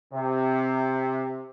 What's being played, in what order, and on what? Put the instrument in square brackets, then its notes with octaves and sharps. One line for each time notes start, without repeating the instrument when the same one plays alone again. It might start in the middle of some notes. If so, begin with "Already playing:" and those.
[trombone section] C3